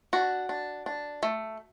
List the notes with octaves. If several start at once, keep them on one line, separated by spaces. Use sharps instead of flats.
D4 F#4
D4
D4
A3